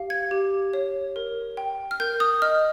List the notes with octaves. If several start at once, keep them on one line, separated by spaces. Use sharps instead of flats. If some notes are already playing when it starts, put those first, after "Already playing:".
Already playing: G4 F5
G#6
G4
C#5
A#4
G5
F6
A#4 G6
D#6
D#5 F6